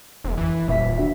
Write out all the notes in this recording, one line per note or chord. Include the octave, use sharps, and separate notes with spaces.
E1
G#1 F2 E3
D#1 A#2 E5 B6
D4 F#4 E5